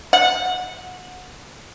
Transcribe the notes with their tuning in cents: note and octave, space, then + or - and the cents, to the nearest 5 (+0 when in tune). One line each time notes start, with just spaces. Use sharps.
F#5 -20